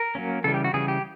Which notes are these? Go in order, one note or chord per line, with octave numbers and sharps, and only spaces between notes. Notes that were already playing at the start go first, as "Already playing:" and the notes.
Already playing: A#4
F#3 A#3 C#4
C#3 E3 G3 A4
G4
F#4
C#3 E3 G3 G#4
G4